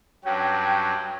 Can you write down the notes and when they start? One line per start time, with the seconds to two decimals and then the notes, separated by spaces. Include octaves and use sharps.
0.25 G2 F#3 C#4 G5